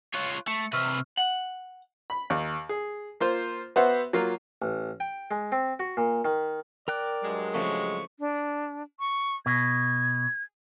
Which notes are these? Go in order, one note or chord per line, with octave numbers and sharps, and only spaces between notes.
F4 C#5 F#6
A3 C#7
C3 B4 C#6 E6 F6
F#5
B5
D#2
G#4
A#3 F4 C5
B3 F#4 C5 E5 F#5
F#3 A#3 F4
A1
G5
G#3
C4
F#4
A#2
D#3
A#4 D5 G5 F#6
G2 F#3 G#3
C#3 F3 A3 C#6
D4
C#6
B2 G#6